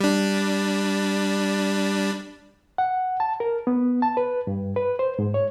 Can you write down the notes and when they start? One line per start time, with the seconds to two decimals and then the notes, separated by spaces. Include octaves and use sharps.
0.01 G3 D4
2.78 F#5
3.20 A5
3.40 A#4
3.67 B3
4.02 A5
4.17 B4
4.47 G2
4.76 B4
4.99 C5
5.19 G#2
5.34 C#5